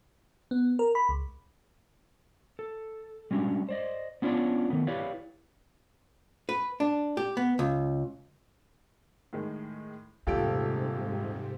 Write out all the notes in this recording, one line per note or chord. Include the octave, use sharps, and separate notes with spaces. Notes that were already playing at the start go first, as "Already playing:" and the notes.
B3
A#4
B5
C#2
A4
G3 G#3 C#4 D4 F#4
C5 D5 D#5
B3 C#4 D4 F4 C#5 D5
D#3 A3 B3
E4 G4 B4 C#5 D5 F5
B4
D4
G4
B3
C#2
A2 D#3 G#3
D#1 E2 G#2 C3 F4 G4 A4 D7